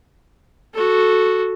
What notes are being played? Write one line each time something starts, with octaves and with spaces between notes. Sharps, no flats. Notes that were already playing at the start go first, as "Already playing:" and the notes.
F#4 A4